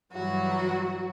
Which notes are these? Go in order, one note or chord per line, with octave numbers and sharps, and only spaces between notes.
G2 E3 F#3 G3 F#4